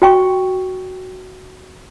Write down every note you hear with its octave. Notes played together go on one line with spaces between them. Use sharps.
F#4 G5 C#6